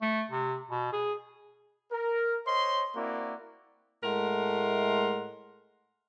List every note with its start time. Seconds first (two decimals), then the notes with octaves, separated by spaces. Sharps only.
0.02 A3
0.31 C3
0.70 B2
0.93 G#4
1.91 A#4
2.46 C5 C#5 D#5 C6
2.96 A#3 C4 E4 F#4 D5
4.04 A2 G#3 A3 A#4 F#5 C6